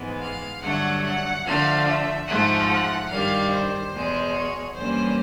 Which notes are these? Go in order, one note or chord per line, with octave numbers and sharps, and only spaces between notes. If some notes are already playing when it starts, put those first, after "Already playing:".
Already playing: G#2 E3 G#3 B3
F5
G2 D3 F#3 A3 F#5
F#5
D3 F3 A3 F5
E5
G#2 F3 A3 F#5
F#5
G2 D#3 G3 F5
C5
E2 B2 G#3
C#5
G2 E3 G3 A#3 C#4 C5